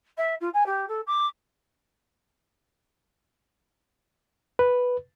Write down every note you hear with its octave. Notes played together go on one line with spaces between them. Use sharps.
E5
F4
G#5
G4
A4
D6
B4